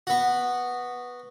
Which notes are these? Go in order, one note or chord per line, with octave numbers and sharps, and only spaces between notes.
B3 F#4